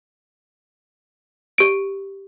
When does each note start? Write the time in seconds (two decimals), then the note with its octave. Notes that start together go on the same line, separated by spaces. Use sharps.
1.58 G4 D7